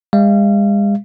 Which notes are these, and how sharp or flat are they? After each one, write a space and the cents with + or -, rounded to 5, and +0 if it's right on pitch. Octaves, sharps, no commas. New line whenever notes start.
G#3 -40 F5 -35